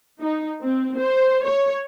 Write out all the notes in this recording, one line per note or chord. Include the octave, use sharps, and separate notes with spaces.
D#4
C4
C5
C#5